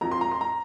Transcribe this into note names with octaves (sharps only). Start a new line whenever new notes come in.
F2 F3 A#5
C6
A#5
C6
A#5